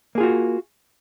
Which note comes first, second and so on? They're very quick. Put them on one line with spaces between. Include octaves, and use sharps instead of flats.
A#3 G#4 F4 F#4